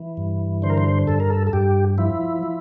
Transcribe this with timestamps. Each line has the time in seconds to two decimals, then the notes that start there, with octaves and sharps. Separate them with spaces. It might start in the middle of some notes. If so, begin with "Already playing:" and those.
Already playing: E3
0.17 G2
0.62 D3 C5
0.70 A#4
0.78 C5
1.07 G2 A4
1.20 A#4
1.30 A4
1.47 A4
1.53 G2 G4
1.98 F3 E4
2.43 F3